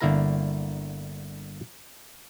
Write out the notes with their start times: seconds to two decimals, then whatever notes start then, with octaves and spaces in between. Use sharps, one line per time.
0.01 G1 D3 A#3 E4 A#4 A#5